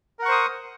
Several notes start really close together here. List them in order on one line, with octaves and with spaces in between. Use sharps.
A#4 F#5 C#6 C5 D#6